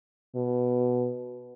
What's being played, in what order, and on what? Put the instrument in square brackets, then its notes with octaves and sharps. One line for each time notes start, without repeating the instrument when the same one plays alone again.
[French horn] B2